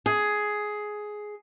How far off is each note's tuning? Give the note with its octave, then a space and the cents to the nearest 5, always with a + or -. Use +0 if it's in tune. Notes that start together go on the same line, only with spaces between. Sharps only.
G#4 +10